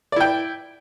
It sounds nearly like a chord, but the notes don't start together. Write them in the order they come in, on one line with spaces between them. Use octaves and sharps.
D5 E4 G5